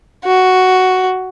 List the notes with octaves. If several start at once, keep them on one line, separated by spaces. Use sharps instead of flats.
F#4